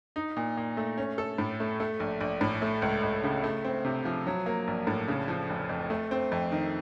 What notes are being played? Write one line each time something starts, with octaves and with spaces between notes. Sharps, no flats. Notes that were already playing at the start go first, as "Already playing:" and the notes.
D#4
A#2
A#2
A3
C#4
A4
A2
A3
A3
A#1
A#1
A2
A3
C#2
C#2
C#3
A3
C4
C3
F3
F#3
A#3
A#1
A2
C#3
F3
F1
F2
A3
C4
F2
D#3